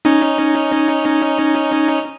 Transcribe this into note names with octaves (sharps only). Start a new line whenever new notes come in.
C#4 D#4